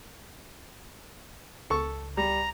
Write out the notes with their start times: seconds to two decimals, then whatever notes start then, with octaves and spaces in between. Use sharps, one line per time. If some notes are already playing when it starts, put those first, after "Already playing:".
1.70 C#2 A4 C#6
2.17 G3 A#5